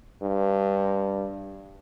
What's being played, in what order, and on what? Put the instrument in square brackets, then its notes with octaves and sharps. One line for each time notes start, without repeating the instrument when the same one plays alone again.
[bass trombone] G2